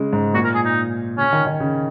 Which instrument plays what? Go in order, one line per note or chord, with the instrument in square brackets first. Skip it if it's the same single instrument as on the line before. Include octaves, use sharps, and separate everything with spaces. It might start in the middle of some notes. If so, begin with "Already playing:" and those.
Already playing: [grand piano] C#3 G#3
G#2
[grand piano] A#2 [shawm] F#4
[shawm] A#4
G#4
D#4
[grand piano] C#3 [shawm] C#4
[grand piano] D#3
D#3
C#3